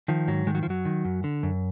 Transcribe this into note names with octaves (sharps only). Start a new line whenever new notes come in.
D#3 F3
G#2 F#3
D#3 G#3
F#3
F3
F#2 F#3
D#3
F#2
D3
F#2